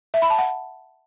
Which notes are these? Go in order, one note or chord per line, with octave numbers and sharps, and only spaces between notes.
E5
B5
A5
F#5